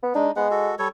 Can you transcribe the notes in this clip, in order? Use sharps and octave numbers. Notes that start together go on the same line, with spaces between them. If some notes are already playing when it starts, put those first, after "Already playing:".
B3
G#3 D4 D#4
G#3 B3 F#5
F#4 A4
G3 A4 C#5